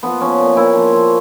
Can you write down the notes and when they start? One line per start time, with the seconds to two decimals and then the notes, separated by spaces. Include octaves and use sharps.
0.03 F3 B3
0.21 F3 C#4
0.39 A#2
0.57 A#2 E4
0.75 F3
0.93 F3